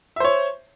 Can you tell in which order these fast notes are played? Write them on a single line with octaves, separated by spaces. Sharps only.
E5 C5 C#5